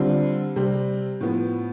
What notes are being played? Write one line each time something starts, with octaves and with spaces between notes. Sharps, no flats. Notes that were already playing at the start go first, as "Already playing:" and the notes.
Already playing: D3 G3 C4 F4
C3 G3 C4
A2 F3 B3